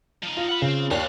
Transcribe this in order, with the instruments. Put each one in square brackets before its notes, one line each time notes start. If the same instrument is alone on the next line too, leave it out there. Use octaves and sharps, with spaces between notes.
[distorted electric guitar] F3 D#4
[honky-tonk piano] F4
[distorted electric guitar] F#5 B5
[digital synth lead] C#3 [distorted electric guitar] C4
[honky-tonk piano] D#2 [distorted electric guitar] G3 F5 [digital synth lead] F#6